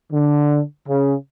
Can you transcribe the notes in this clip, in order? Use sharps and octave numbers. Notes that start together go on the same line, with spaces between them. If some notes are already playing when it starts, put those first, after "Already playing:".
D3
C#3